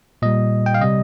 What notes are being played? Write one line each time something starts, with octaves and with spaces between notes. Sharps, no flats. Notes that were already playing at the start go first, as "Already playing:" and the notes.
A#2 G3 D#5
G5
F5
C3 G3 D#5